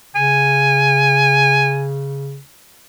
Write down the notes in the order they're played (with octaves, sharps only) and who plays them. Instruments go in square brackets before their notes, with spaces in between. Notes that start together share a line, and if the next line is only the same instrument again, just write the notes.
[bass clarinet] C#3 [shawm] G#5